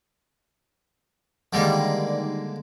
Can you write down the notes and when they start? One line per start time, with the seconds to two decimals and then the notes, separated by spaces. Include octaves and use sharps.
1.53 D3 D#3 G3 G#3 A#3